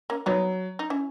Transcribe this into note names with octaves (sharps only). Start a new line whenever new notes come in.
A#3 C#4
F#3 B3 D#4
D#4
C#4 E4